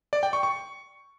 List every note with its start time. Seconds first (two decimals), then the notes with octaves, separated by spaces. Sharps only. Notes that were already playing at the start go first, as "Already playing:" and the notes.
0.13 D5
0.23 G5
0.33 C#6
0.43 C#6